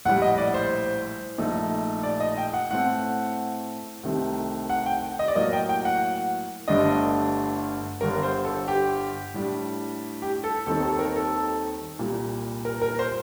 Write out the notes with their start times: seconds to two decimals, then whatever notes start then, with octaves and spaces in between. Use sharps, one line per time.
0.05 A#1 A2 G3 F#5
0.22 D#5
0.38 D5
0.54 C5
1.38 A#1 A#2 A3 D#4
2.03 D5
2.20 D#5
2.38 G5
2.54 F#5
2.71 A2 A3 C4 F#5
4.03 C2 C3 D#3 A3 C4
4.69 F#5
4.86 G5
5.19 D#5
5.28 D5
5.35 A2 F#3 A#3 D#5
5.53 G5
5.69 G5
5.85 F#5
6.68 G1 G2 D3 A3 D4 D#5
8.01 G1 G2 D3 A#4
8.23 C5
8.44 A4
8.68 G4
9.34 A2 G3 D4
10.22 G4
10.44 A4
10.66 D#2 D#3 G3 C4 D#4 A4
10.83 A4
10.99 A#4
11.16 A4
11.99 C2 A#2 G3
12.65 A#4
12.82 A#4
12.99 C5